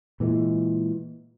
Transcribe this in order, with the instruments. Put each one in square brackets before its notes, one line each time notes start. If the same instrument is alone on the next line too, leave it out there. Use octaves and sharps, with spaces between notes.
[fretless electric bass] A#2 E3 G#3